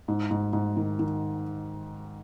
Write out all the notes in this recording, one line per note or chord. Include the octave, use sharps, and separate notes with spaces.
G#2
G#2
G#2
D#3
D#3